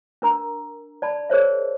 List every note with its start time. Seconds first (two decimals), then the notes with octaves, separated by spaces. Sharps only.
0.22 D4 A#4 A#5
1.02 D5 A5 B5
1.30 G#4 A#4 C5 C#5 D#5 E5